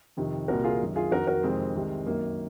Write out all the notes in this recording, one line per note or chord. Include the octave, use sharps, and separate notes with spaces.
F2 C3 D#3
C2 A#2 F#4 A#4
F4 G#4
F#2 D#3
F4 G#4
F2 D#3 F#4 A#4
F#4 A#4
F2 C3 D#3 G#3 C4
C2 C3 D#3
F#2 D#3 A#3